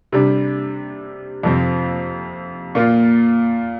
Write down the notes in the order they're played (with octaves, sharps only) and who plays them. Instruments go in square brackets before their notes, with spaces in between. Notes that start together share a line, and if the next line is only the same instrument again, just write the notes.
[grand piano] C3 G3 D4
F2 C3 F3 C4
A#2 A#3 F4